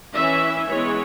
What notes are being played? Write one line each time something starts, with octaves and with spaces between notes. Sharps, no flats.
E3 C#4 E5
E3 G#3 B3 C#5